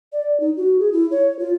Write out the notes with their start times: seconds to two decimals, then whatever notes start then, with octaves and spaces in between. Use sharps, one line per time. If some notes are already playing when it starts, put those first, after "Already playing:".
0.13 D5
0.40 D#4
0.57 F#4
0.79 G#4
0.93 E4
1.11 C#5
1.39 F4